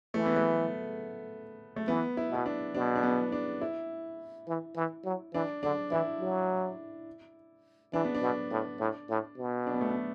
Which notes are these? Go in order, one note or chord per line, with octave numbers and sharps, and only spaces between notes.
E3 A3
B3
A3
A3
E3 B3
E4
B2 E4
D4
B2 D4
D4
B3
D4
E4
E3
E3
F#3
E3 D4
D3 D4
E3 E4
F#3
E3 D4
B3
D4
B2
A2
A2
A2
B2
D4
B3
A3
B3